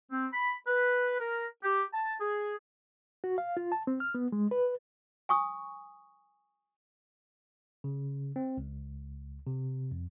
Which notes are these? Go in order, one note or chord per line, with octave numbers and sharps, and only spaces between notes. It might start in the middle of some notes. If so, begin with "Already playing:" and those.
C4
B5
B4
A#4
G4
A5
G#4
F#4
F5
F4
A5
C4
F6
B3
G#3
B4
G#5 C#6 D#6
C#3
C4
C#2
C3
F2